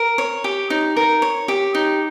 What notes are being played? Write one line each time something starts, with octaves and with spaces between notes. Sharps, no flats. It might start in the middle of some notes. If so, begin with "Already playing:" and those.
Already playing: A#4
C#5
G4
D#4
A#4
C#5
G4
D#4